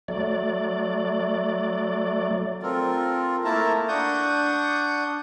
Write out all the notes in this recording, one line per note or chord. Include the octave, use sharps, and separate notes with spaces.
F#3 A3 D5
C4 F4 A4 A#4
A3 A#3 E4 A#4 A5 A#5
D4 F#5 C#6 D#6 G6